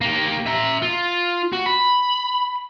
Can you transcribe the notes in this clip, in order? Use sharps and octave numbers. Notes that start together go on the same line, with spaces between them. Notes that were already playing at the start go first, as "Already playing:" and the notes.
A#3 G4
E5 A#5
F4
F#4
B5